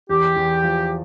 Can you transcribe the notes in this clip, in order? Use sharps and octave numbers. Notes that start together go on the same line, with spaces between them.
E2 G4
E2
F3